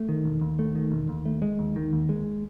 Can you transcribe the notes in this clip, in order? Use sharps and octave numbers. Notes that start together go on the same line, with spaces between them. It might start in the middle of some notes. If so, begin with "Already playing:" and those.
Already playing: A3
D#3
E1
D#2
A3
D#3
E1
D#2
A3
G#3
D#2
D#3
D#2
G#3